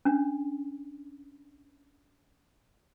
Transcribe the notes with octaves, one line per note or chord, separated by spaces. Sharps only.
C#4 D4